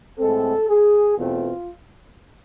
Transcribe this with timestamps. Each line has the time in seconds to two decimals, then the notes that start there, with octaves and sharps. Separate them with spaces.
0.19 A2 G#3 C4 A4
0.69 G#4
1.17 E2 B2 A3 C4 F4